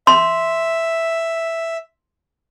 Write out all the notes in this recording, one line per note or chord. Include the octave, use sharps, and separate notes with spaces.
E5 C6